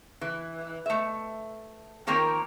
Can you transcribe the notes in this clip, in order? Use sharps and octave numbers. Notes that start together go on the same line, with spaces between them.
E3
A3 E5
D#3 F3 A#3 C4 A#4 C#5